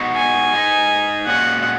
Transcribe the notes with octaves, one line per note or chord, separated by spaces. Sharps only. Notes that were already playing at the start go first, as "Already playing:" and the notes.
Already playing: G#3 B3 D#4 F#4
G#5
G#3 D#4 G#4
A#2 G#3 C#4 F#4 F#5